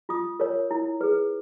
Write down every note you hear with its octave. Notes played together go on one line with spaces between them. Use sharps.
F4 D#6
A#4 C#5
E4
G#4 B4